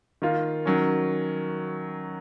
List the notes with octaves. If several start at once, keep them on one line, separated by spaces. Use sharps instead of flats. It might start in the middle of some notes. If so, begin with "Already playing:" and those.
D#3 A#3 F4
D#3 F#3 C#4